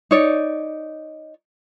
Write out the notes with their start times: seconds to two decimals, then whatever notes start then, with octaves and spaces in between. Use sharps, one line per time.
0.11 D#4 C#5 D5